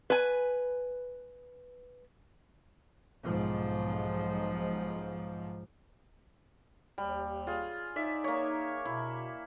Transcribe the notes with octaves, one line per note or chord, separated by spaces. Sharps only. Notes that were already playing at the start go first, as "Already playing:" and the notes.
B4 G#5
B1 G#2 F3
D#2 G3
F4 G#4
D#4 D5 E5
A#3 C#5
B2 E4